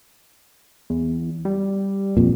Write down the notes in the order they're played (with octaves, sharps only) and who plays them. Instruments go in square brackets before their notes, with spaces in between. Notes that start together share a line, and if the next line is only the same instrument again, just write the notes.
[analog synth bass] E2
G3
[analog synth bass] A#1 [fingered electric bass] F2 A#2